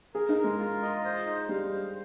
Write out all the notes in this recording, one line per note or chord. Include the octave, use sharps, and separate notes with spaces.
G#4 A#4
D#4
A#4
G#3
F4
D#5
C5
D#4
G3 F5
C5